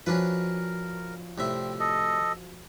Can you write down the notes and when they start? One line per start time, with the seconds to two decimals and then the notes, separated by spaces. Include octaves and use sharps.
0.06 F3 C#4 D4 F#4 A#4 B4
1.38 C2 A2 C4 E5
1.80 A4 D#5